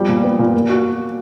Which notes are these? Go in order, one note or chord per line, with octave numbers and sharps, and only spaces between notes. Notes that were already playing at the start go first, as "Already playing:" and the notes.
Already playing: F3 G3
A#2
B3
A#2
A#3
F#4